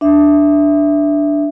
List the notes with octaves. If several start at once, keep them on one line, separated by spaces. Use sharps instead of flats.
D4 E5